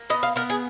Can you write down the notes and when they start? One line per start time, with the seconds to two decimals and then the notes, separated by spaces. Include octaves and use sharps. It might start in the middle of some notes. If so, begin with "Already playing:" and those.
Already playing: A#3
0.10 B3 D#5
0.23 F5
0.36 B3 A#4
0.50 G#4